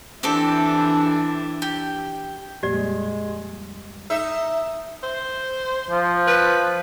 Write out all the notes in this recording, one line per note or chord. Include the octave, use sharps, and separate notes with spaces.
E3 C4 D4 E4 G4 A4
G4
F2 A#2 G3 G#3 G4 D5
D#4 E5
C5
F3
B4